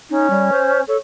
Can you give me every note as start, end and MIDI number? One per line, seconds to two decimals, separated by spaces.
0.10 0.81 61
0.10 0.30 63
0.30 0.50 55
0.52 0.81 72
0.88 0.97 69
0.88 0.96 73